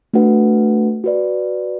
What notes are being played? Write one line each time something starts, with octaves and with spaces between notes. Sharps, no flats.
A3 D4 F#4 B4 F#5
F#4 B4 D5